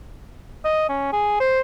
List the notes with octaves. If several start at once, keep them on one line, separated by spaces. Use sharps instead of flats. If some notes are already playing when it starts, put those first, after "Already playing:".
D#5
C#4
G#4
C5